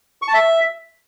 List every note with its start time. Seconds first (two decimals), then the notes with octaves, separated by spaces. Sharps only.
0.22 C#6
0.28 A5
0.34 E5